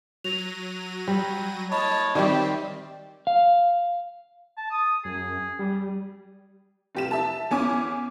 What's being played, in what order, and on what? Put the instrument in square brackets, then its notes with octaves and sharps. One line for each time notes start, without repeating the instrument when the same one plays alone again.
[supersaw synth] F#3 A#6 D#7 [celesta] F7
[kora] G3
[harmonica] C#5 A5 [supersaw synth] D#5 [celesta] B5
[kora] D#3 G3 [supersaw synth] C4 [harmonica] G4 E5 [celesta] D5
[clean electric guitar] F5
[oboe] A5
D#6
[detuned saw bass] F#2 [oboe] G#4
[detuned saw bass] G3
[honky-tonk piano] F1 G4 E7
E5 A5
E2 C#4 G#5 D6